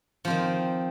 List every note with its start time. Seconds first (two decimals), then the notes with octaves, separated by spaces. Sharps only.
0.25 F3
0.27 C4
0.30 D#3